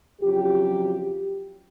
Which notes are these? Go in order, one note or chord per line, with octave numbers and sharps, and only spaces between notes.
F2 C#3 F#3 F4 G4